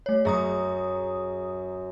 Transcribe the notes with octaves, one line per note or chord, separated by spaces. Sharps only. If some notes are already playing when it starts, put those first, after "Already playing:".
A3 C#5
F#2 G#4 A#5 D#6 A#6